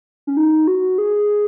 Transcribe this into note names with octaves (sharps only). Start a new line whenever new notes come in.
C#4
D#4
F#4
G#4